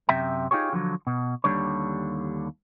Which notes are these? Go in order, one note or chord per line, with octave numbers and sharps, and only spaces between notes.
F#2 C3 E5 G5 A#5
D#4 F4 G4 G#4 C#5
D3 F3 F#3
B2
D#2 B2 D3 G3 D4 C#5